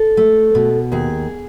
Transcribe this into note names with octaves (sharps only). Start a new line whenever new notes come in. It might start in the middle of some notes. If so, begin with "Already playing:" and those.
Already playing: A4
A3
B2
D#2 G#4